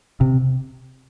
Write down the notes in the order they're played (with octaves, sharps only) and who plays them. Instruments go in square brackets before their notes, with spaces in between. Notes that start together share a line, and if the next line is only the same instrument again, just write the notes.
[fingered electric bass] C3